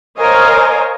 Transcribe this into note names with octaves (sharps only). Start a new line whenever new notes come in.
A#4 C5 C#5 D#5 F5 G#5